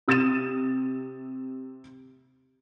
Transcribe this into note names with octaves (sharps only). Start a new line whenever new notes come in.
C3 D#6 A6 D#7 E7